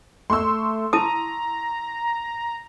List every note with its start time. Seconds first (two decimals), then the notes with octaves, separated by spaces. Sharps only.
0.30 A3 C6 C#6 E6
0.93 E4 A5 A#5 D#6